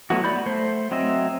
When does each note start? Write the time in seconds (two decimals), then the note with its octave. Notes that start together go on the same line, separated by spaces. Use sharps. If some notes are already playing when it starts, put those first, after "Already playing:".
0.10 F#3 A3 B3 E4 F#4
0.24 D5 B5 G6
0.46 A3 C5
0.91 F#3 C4 D#5 E5